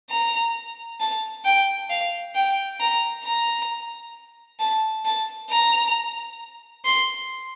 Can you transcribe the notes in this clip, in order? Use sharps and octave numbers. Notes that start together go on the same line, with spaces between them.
A#5
A5
G5
F5
G5
A#5
A#5
A5
A5
A#5
C6